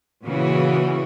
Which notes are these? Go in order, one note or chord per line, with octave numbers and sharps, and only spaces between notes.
A#2 C#3 E3 F#4